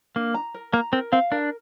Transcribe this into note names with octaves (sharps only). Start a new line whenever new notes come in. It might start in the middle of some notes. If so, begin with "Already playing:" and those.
A#3 D4
A#5
A#4
A#3 A#5
C4 A#4
C4 F5
D4 A#4